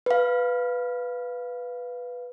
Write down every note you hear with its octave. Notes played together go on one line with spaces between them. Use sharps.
B4 F5